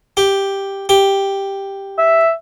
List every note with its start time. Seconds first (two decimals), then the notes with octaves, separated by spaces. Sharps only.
0.17 G4
0.89 G4
1.98 E5